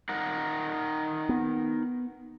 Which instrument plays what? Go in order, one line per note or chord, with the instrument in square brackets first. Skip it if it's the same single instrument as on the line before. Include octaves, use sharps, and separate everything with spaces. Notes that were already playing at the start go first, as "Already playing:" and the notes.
[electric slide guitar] D#4 A#4 F#5
[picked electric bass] B3